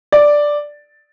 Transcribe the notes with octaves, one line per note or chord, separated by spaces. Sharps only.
D5